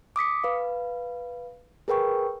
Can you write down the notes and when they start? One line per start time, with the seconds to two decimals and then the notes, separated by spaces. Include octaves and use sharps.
0.16 D6 D#6 B6 C#7
0.44 B4 F5
1.88 G#4 A#4 B4 G5 C#6